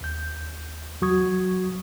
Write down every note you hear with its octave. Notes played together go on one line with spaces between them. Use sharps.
D#2 G6
E2 F#3 F#4 C#6 D#6 G#6